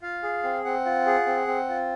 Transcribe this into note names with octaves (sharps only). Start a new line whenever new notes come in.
F4 F5
G#4
C4
C4 F#5
F4
G#4
C4
C4
F4